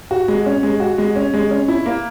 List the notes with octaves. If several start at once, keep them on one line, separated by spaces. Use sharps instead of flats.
F#4
G#3
C#4
G#3
F#4
G#3
C#4
G#3
C#4
E4
A#3